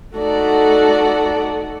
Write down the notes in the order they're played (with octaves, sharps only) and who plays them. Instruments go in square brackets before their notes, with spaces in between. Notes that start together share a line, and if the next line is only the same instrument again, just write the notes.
[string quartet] A3 D#4 F#4 A4 D5 F#5